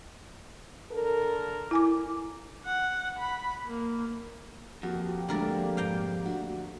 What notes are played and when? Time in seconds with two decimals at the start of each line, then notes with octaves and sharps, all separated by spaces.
0.91 D3 A4 A#4
1.71 E4 G#5 D6
2.66 F#5
3.19 B5
3.66 A#3
4.83 F2 A#3 F#4 G4
5.29 D3 G#3 A3 D4 A#4 D5
5.77 G#2 F5 G5 A#5
6.25 A3 D4 F#4